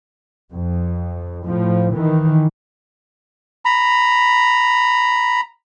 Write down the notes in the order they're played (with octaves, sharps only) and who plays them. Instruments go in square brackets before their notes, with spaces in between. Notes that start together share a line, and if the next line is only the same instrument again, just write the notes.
[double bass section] F2
A2 F3
D#3 E3
[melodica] A#5 B5